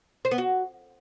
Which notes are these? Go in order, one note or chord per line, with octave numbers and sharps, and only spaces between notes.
C5
B3
F#4